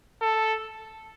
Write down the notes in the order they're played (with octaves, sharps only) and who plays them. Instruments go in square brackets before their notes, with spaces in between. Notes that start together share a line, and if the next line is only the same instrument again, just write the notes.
[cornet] A4